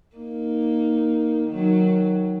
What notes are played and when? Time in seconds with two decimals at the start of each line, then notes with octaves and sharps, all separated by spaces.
0.16 A#3 D#4
1.47 D#3 F#3